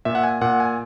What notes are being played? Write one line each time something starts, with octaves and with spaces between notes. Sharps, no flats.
A#2 E5
F#5
G#5
A#2 F#5
G#5